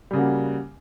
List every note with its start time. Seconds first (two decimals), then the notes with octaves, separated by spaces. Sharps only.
0.11 G3
0.13 C#3
0.16 A#3
0.18 F#4